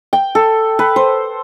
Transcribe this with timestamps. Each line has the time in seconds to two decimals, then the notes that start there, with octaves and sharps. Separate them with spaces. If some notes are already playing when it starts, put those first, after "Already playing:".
0.13 G5
0.35 A4
0.79 B4
0.96 C5